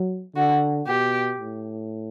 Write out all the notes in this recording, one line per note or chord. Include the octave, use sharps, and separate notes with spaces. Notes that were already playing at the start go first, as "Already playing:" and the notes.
Already playing: F#3
D3 F#4
B2 G4
A2